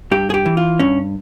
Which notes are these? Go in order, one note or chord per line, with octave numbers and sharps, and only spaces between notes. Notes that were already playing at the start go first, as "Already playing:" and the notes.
G2 G4
G#4
G4
E3
F4
G2 C#4